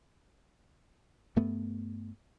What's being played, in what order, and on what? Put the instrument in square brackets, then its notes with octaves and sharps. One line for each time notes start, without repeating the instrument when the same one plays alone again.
[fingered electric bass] G2 A3 B3